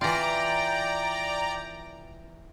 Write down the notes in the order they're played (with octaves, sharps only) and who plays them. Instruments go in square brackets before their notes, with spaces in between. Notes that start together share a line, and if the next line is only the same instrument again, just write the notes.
[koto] E3 F4 [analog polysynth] D5 A#5 [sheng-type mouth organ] G5